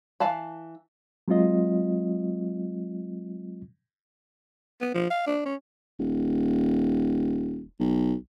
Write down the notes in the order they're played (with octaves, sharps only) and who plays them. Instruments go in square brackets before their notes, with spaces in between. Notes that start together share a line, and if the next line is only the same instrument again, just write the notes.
[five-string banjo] E3 F5 A5 B5
[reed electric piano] F#3 G#3 C4 F4 D#5
[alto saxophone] B3
F3
F5
D4
C#4
[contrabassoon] D#1
B1